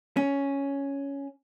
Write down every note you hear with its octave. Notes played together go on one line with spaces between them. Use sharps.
C#4